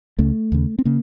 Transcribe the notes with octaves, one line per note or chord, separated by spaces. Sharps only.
C#2 C#3 A3
D#2 C#3
C4
C#3 A#3